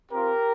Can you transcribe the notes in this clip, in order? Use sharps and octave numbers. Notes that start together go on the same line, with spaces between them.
C4 F4 G4 A#4